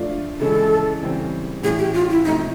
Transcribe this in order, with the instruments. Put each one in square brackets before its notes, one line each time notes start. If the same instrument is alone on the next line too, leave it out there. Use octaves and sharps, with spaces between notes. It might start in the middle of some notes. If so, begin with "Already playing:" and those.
Already playing: [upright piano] F3 A3 D4 F4
[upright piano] C#3 E3 G#3 C#4 E4 [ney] A4
[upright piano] C#3 E3 G3 C4
[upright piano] A2 E3 A3 C#4 [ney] G#4
[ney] G4
F4
E4
[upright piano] C3 F3 A3 [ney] D#4